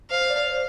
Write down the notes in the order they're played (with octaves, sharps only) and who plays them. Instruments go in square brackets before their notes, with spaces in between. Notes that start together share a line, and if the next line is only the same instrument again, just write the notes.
[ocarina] C5 [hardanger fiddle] F5
[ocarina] D5
C5